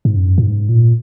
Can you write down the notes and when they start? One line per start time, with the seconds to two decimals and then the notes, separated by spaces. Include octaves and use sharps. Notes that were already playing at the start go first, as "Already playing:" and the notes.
0.05 G#2
0.16 F#2
0.38 A#2
0.42 G#2
0.69 A#2